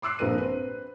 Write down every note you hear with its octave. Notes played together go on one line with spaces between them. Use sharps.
C6 D6 E6 F#6 C7
A#1 G2 C4 A#4 B4 D#7
C4 B4